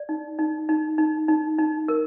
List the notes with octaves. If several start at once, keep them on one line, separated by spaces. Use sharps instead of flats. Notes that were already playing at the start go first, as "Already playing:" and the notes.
Already playing: D5
D#4
D#4
D#4
D#4
D#4
D#4
A#4